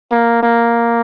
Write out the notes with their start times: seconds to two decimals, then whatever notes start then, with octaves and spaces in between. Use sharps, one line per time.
0.11 A#3
0.43 A#3